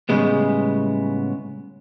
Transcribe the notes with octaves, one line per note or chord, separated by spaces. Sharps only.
A2 C#3 G3 G#3 B3